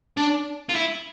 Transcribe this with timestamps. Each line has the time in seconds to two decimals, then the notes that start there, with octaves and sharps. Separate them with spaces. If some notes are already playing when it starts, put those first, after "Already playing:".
0.17 D4
0.69 F4
0.75 E4